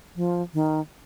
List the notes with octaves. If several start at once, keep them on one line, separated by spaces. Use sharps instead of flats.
F3
D#3